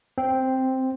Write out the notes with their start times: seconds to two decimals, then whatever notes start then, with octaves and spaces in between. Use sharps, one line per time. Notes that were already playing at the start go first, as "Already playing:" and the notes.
0.18 C4